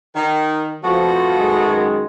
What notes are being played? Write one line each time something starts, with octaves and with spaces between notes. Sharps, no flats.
D#3
F2 F3 A3 B3 F#4
F#2 D#3 G#3